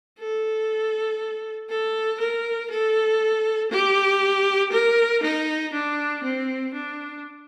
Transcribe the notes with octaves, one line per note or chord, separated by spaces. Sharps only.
A4
A4
A#4
A4
G4
A#4
D#4
D4
C4
D4